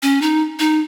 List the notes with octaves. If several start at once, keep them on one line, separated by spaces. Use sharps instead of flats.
C#4
D#4
D#4